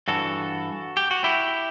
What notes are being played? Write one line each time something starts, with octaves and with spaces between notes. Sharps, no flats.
G2 E3 F#4 A4
G4
F#4
E4 G4